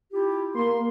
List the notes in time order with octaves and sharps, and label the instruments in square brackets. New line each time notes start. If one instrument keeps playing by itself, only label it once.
[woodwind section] E4 F4 G4
[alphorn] A#3 [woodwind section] C6